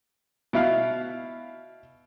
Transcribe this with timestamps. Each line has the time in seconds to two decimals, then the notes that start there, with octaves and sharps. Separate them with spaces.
0.53 B2 E4 F5